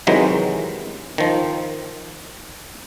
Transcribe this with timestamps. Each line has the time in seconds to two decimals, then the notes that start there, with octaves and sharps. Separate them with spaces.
0.07 C3 D#3 E3 F#3 G#3
1.18 D#3 F3